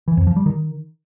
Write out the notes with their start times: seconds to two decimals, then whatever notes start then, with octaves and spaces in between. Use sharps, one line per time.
0.08 E3
0.17 F2
0.27 F3
0.36 G3
0.46 D#3